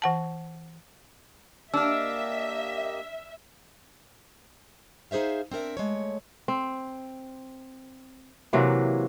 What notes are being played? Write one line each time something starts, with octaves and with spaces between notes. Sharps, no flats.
E3 F#5 A5
A#3 D4 G4 D#5 E5 E6 F6
D#4 G#4 C5 E5 F5
C4 D4 A#4 E5
G#3 A3 C#5
C4
C3 E3 F#3 A#3